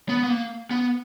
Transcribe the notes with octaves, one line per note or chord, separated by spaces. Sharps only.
B3
B3
A#3
B3